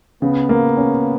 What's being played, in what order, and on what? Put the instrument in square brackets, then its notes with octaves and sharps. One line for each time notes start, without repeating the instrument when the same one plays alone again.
[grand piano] C#3 [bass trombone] B3
[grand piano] A#3
C#4